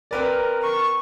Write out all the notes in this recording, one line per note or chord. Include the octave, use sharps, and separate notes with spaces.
C4 A#4 B4 D5
C#6